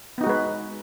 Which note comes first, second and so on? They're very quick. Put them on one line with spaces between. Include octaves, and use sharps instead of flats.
B3 D#4 F#4 G#3 B4